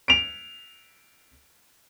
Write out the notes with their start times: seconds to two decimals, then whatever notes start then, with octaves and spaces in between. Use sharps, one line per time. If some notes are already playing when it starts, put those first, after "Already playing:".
0.08 D7 F7